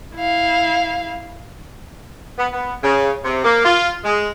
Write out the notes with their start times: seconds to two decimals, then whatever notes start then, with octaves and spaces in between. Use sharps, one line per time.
0.16 E4 F5
2.38 B3
2.53 B3
2.83 C#3
3.25 C3
3.44 A#3
3.64 F4
4.04 G#3